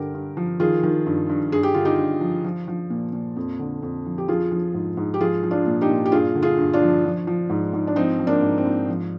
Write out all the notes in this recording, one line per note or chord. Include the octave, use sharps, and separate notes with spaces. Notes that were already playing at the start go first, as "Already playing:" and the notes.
Already playing: G2 D3 G4 A#4
G2
F3
D#3 F4 G#4
D#3
G2
G2
G2 G#4
G4
D3 F4
D#4 G4
G2
F3
F3
F3
A#2
A#2
F2
D3
F2
F3
G4
F3 F4 G#4
F3
G#2
G#2
G4
F3 F4 G#4
F3
D4 F4
A#2
D#4 G4
A#2
G4
G2 F4 G#4
D3
F4 G#4
G2
D4 F4
F3
F3
F3
G#2
G#2
D4
F3 C4 D#4
F3
A#3 D4
G#2
C4
G#2
F3